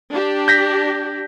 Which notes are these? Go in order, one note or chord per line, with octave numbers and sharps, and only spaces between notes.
D4 G4
G6 A#6 B6